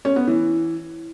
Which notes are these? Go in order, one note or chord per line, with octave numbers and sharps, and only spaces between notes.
C#4
B3
E3